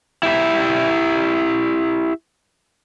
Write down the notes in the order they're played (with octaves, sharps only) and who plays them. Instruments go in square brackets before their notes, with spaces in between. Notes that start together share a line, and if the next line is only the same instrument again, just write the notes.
[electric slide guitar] E4 G4 E5